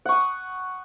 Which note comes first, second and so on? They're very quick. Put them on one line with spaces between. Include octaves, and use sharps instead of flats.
F#5 C#6 D#6